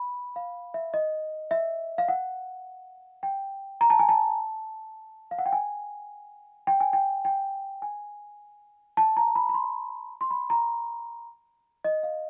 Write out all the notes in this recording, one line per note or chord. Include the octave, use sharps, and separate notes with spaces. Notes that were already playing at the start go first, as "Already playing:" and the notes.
Already playing: B5
F5
E5
D#5
E5
F5
F#5
G5
A#5
A5
G#5
A5
F5
F#5
G5
G#5
G5
G#5
G5
G5
G#5
A5
A#5
B5
B5
C6
C6
B5
A#5
D#5
F5